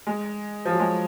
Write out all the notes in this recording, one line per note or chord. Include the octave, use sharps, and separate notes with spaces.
G#3
F3
F#3
G#3